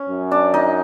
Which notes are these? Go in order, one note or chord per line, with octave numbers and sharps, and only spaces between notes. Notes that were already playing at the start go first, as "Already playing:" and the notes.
Already playing: C#4 C#5
F#2
D4 D5
D#4 D#5